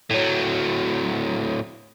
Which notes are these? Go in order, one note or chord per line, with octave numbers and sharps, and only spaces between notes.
A2 F#3